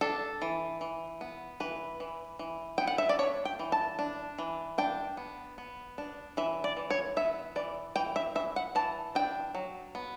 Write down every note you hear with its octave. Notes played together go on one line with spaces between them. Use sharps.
D4 A4
E3
E3
B3
E3 B4
E3
E3
B3 G5
F#5
E5
D5
D4 C#5
G5
E3
A5
D4
E3
D4 G5
B3
B3
D4
E3 E5
D5
E3
C#5
B3 E5
E3 D5
E3 G5
E5
E3 E5
F#5
E3 A5
D4 G5
F#3
B3